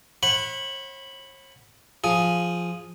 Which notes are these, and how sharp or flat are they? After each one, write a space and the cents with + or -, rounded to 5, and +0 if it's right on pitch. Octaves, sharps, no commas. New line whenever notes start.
C#5 -45 F#5 +0 B5 +0
F3 +0 G#4 +0